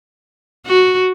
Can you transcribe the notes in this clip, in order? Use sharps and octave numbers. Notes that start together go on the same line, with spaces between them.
F#4